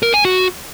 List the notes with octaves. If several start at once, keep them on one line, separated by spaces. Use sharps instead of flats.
A#4
G#5
F#4